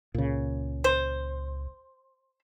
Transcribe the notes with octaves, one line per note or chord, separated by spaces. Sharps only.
C#2 A#2 C#3
C5